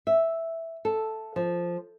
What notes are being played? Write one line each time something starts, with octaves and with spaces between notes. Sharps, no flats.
E5
A4
F3